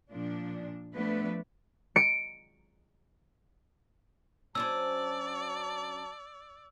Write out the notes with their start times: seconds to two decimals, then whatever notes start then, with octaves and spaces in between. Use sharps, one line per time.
0.12 A#2 F3 D4
0.94 F3 A3 B3 D4 B4
1.96 C#7 D7
4.55 F#3 C#4 D4 C5 D5 A5 E6